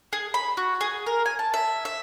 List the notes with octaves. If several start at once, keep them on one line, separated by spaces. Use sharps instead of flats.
G#4
B5
F#4
G#4
A#4
G#5
A5
E5
E5